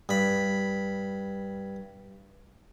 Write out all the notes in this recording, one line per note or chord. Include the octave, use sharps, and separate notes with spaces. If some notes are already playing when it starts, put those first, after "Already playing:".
G2 B5